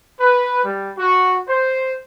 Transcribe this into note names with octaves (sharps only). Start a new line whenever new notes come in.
B4
G3
F#4
C5